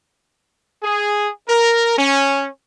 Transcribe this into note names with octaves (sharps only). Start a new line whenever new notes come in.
G#4
A#4
C#4